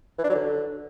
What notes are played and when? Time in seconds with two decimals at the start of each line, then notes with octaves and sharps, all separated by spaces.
0.19 E3
0.24 D4
0.29 F#3
0.35 D3